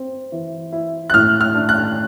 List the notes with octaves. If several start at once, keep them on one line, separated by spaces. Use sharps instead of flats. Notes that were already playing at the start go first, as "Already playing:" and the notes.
Already playing: C4
E3
E4
F#6
A2 F6
F6
D4
F#6